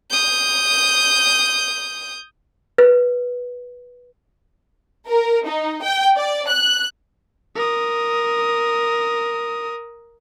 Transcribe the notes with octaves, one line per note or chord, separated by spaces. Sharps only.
D#6 G6
B4
A#4
D#4
G5
D5
F#6
A#4 D#6